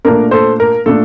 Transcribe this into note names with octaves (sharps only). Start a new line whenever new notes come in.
A#2 A3 D4 A#4
A4 C5
A#4
A#2 A3 D4 A4